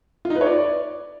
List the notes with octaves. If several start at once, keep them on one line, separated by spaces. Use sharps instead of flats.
F4
D#4
B4
C#5
D5